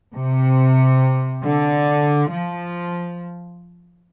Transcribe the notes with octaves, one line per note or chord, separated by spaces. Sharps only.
C3
D3
F3